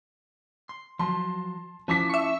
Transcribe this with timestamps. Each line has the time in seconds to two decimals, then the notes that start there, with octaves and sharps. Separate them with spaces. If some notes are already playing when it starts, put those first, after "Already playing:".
0.69 C6
0.99 F3 F#3 A5 C6
1.88 F3 C#4 E4 A5 D6 B6
2.09 E5 C#6